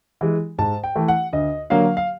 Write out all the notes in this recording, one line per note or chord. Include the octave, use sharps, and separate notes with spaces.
E3 G#3
G#2 A5
G5
E3 A3
F#5
D2 D#5
D3 F#3 A#3 F5
F5